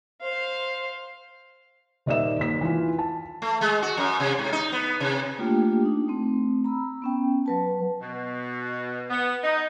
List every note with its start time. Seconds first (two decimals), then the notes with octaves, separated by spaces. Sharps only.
0.21 C5 F5
2.06 D#1 D#3 D5 E5 E7
2.39 D#2 B6
2.61 E3 F4
2.99 A5
3.42 A3
3.61 G#3
3.82 F#4
3.97 F#2
4.20 C3
4.39 G#2
4.53 D#4
4.72 B3
5.00 C3
5.38 A3 A#3 D4 F4 G4 G5
5.83 D4 D#4
6.08 A3 C4
6.64 A#5 B5 E6
7.02 B3 C#4 G5
7.46 F#3 B4 A5
8.02 B2
9.10 B3
9.43 D#4